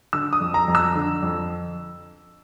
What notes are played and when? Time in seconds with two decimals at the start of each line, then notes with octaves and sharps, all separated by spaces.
0.13 D3 E6
0.33 D#6
0.40 F2
0.54 A#5
0.68 F2
0.75 E6
0.95 D3
1.22 F2